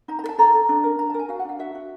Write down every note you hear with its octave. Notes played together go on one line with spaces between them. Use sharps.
D#4 A#5
A#5
A4
A5
A4 A#5
A4
D4
A#4
D4 A#5
A5
A#4
G#5
F#4 F5
F#5
D4 F5
F#4 E5
F#4